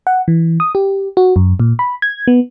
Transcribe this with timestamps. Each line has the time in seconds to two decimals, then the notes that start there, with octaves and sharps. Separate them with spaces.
0.07 F#5
0.28 E3
0.60 D#6
0.75 G4
1.17 F#4
1.36 F#2
1.60 A#2
1.79 B5
2.02 G#6
2.28 B3